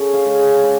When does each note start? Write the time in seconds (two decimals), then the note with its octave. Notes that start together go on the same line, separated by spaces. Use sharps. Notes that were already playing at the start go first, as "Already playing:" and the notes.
Already playing: C#3 A4 C#5
0.13 F5
0.26 G#3
0.64 D5